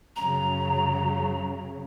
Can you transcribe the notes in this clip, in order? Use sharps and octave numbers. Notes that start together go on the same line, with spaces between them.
F#2 C#3 F#3 A#5